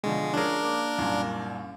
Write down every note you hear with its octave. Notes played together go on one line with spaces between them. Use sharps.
B2 D3 F3 G#3
F3 C#4 D4 G#4 A#4
A#3 D6
C2 F#2 A#2